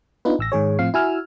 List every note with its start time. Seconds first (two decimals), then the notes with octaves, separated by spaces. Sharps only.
0.25 B3 D4 D#4 F4 B4
0.39 A1 E6 A#6
0.52 G#2 D#3 G#4 C#5
0.79 A2 F3 C4 F4 F5 C7
0.94 E4 F#4 G#5 E6 F6